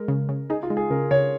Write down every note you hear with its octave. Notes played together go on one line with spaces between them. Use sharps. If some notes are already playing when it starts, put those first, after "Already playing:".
Already playing: G#3 A#4
C#3
C#3
D#4 G#4
F4
G#3
G#4
C#3 A#4
C#3 C#5